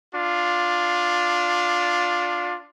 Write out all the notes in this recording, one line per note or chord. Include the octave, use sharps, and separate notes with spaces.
D4 F4